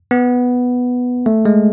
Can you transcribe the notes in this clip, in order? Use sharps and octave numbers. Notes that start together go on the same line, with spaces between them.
B3
A3
G#3